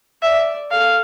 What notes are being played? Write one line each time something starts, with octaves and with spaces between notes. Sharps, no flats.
D5 E5
A4 F5